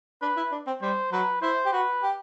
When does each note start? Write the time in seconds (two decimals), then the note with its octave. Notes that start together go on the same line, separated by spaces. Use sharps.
0.22 D4 B4
0.37 E4
0.52 D4
0.67 C4
0.82 G3 C5
1.12 F#3 B4
1.42 E4 C5
1.66 G4
1.73 F#4 B4
2.03 G4